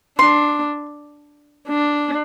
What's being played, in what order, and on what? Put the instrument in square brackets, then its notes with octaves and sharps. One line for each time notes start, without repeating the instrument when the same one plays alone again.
[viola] D4 [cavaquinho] C6
[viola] D4